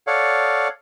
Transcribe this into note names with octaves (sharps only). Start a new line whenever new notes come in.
A4 C#5 D5 F5 F#5